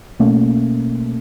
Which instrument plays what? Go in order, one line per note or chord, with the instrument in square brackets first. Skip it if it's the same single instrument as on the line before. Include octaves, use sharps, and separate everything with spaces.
[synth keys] B2 A3 A#3 C#4